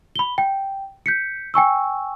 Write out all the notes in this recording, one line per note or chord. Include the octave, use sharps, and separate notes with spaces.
B5 G7
G5
G6 B6 C#7
G5 G#5 C#6 E6